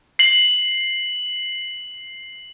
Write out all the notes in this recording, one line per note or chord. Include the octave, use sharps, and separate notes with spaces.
C7 F#7